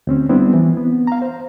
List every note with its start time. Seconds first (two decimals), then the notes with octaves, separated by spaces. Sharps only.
0.07 D2 C4 C#4
0.29 G3 B3 C4 D4 E4
0.54 E3
0.77 B3
1.07 F5 A#5
1.22 C5